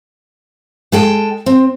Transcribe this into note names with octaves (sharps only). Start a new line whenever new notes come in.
G#3 A4 G5
C4